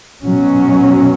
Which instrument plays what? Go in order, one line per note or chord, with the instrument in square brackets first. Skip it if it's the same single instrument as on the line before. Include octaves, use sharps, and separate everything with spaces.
[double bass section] B2 F#3 C#4